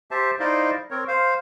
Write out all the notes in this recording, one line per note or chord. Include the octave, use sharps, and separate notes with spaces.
G4 C5 E5 A5
D#4 E4 C5 D5 D#5 F5
C4 A#4 C#5
C5 F5